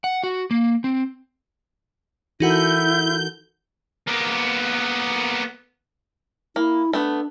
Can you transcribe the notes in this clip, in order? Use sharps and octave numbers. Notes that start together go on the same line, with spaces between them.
F#5
F#4
A#3
C4
E3 D#4 E4 F#4 A4 A#4 F#5 G6
A#3 B3
A#3 E4
A3 B3 D4